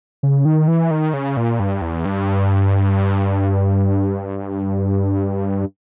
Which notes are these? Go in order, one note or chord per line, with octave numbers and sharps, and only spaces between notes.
C#3
D#3
E3
D#3
C#3
A#2
G2
E2
G2